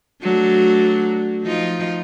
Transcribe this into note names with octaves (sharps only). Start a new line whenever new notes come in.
F#3 A3 D4
F3 D#4 F4